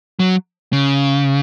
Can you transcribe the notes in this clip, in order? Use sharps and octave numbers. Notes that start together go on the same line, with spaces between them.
F#3
C#3